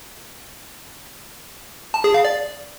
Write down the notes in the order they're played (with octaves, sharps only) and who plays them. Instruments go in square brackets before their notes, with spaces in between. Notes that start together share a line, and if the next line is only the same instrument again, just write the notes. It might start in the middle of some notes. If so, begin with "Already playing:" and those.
[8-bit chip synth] A5
G#4
F5
D5